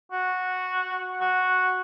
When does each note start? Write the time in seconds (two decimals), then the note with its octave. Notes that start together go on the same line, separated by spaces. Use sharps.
0.12 F#4
1.21 F#4